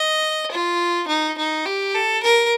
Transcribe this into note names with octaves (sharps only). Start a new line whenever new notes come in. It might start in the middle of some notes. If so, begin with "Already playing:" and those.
Already playing: D#5
F4
D#4
D#4
G4
A4
A#4